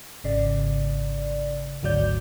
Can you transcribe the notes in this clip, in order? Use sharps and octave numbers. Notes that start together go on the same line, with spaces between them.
G#1 C#3 D5
G#1 D2 F#3 D5 G6